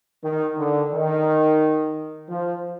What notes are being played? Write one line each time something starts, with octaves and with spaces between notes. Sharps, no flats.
D#3
D3
D#3
F3